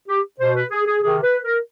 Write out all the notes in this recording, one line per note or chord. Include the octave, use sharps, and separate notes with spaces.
G4
B2 C5
B4
G#4
G#4
C3 D#3 G#4
B4
A#4